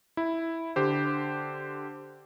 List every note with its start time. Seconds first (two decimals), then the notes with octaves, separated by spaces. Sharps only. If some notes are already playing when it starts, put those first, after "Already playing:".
0.17 E4
0.76 D3 G4 C5